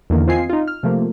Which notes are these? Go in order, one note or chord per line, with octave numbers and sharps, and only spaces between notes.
E2 D3 D#3 A#3
C4 F4 D#5 G#5 C7
D#4 F4
F6
C3 F3 A3 A#3